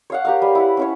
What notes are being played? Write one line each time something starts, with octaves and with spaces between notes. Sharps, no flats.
C#5 F5 F#5
G4 A#4 F5
G3 B4
E4 F#5
C#4 E4 C#5